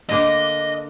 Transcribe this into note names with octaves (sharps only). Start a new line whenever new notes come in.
D3 A#3 D4 D#5